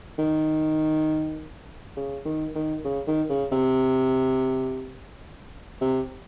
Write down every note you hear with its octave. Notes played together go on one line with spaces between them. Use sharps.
D#3
C#3
D#3
D#3
C#3
D#3
C#3
C3
C3